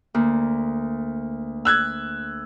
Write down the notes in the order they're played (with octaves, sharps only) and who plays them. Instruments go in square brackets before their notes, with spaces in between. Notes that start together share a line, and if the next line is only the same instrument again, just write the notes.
[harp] D2 A#3
[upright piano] E6 F#6 G#6